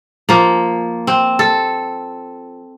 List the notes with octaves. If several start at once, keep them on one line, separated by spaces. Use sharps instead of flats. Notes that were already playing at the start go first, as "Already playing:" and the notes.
F3 A#3
C4
A4